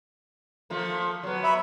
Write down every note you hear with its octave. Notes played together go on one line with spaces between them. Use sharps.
F3 A3 A#3
F#3 B3
E5 B5